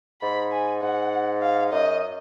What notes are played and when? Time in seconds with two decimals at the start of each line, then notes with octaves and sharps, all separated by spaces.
0.22 G#2 B5
0.52 G#5
0.82 G#2 F#5
1.42 F5
1.72 F#2 D#5